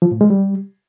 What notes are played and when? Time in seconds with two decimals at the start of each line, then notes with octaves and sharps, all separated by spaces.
0.02 F3
0.11 A2
0.21 G#3
0.30 G3